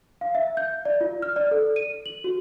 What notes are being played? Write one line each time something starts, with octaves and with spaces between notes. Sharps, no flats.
F5
E5
G6
D5
F4
F6
D5
A4
D#7
F#7
F#4